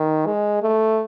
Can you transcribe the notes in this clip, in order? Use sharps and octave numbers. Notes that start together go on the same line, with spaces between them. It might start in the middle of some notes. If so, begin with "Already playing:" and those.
Already playing: D#3
G#3
A3